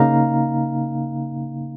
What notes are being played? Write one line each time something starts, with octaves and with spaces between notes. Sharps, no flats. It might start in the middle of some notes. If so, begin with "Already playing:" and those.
Already playing: C#3 A#3 D#4 F5 A#5